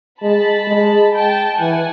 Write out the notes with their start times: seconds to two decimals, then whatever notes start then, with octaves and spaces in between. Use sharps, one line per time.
0.22 G#3 A5 B5
0.68 G#3
1.13 G5 A5
1.59 E3 F#5 G#5